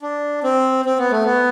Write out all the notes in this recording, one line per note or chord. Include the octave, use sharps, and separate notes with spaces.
D4
C4
C4
B3
A3
B3